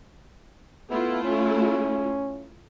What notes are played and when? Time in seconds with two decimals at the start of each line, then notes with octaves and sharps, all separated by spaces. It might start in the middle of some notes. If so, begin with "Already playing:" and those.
0.90 A3 B3 E4 F4
1.25 C#4